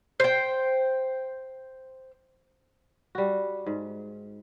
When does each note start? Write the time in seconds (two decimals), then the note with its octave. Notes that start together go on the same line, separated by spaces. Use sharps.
0.20 C5 G5
3.15 G3 F#4
3.66 G#2